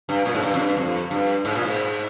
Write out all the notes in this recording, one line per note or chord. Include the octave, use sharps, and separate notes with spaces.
G2
A#2
G#2
G2
F2
G2
F2
G2
G#2
A#2
G#2